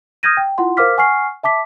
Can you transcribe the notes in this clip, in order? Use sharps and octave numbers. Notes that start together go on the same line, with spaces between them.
D#6 F6 G6 G#6 A#6 D#7
G5
E4 F4 F#5 C6
A#4 C5 F5 D6 F6 B6
F#5 G#5 C#6 F6 C7
E5 A5 D6 B6